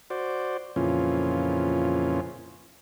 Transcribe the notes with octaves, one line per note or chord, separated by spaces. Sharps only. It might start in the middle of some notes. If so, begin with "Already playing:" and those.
F#4 C5 D5
F2 A#2 C#3 E3 C#4 F4